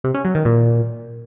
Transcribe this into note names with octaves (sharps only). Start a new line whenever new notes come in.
C3
C#4
F#3
D#3
A#2